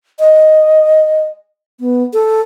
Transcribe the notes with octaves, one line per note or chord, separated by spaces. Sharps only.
D#5
B3
A4